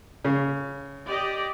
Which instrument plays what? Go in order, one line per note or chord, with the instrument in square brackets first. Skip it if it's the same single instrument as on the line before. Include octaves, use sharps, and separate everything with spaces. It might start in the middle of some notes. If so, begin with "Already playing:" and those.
[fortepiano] C#3
[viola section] G4 D5 D#5